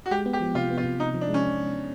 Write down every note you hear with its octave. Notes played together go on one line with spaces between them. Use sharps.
F#4
G#3 G4
B3
G4
F3
C3 F4
B3
F4
C3
C3 D#4
F3
D4
G#3
C#4